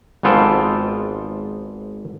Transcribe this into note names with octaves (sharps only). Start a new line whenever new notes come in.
G#1 G#2 B3 F4 A4 G5